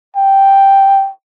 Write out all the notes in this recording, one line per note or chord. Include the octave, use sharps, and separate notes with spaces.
G5